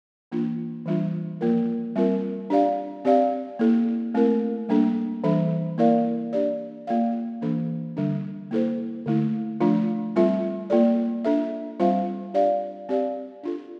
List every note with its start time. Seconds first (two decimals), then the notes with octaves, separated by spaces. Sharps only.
0.32 E3 A#3 D4 F4
0.86 E3 G3 D4 F4
1.41 F3 A#3 F4 A#4
1.96 G3 C4 F4 A#4
2.50 D4 G4 D5 F5
3.05 C4 G4 D5 F5
3.59 A#3 E4 A4
4.14 A3 C4 E4 A#4
4.69 G3 A#3 D4 A4
5.24 E3 G3 D4 A4 E5
5.78 A#3 E4 A#4 D5 F5
6.33 D4 G4 D5
6.87 A#3 F4 A4 D5 F5
7.42 E3 A#3 D4 A4
7.97 D3 G3 D4
8.51 A#3 E4 A4 C5
9.06 D3 A3 E4
9.61 F3 A3 D4 F4
10.16 G3 C4 F4 A4 E5
10.70 A#3 F4 A4 D5
11.25 D4 A4 E5
11.80 G3 C4 F4 C5 F5
12.34 D4 G4 D5 F5
12.89 C4 G4 D5 F5
13.43 D4 F4 A4